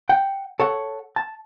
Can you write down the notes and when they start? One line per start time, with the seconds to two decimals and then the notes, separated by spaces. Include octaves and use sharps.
0.09 F#5 G5
0.60 A4 C#5 F#5
1.16 A5